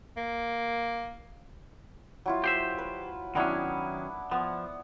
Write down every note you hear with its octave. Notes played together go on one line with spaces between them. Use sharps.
A#3
F#3 E4 F4
G4 C5 E5
B4
D#3 F#3 B3 C#4 D4 E4
F3 B3